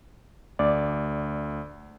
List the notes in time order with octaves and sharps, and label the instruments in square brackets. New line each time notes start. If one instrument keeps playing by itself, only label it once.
[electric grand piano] D2 [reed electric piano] D5